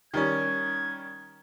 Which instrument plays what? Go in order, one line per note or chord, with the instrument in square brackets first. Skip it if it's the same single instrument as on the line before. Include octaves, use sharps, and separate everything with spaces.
[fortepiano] D#3 G3 C#4 [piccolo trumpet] G#6